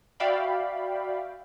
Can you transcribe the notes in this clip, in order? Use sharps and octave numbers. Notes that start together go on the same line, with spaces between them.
F#4 D5 E5 F5 G5 B5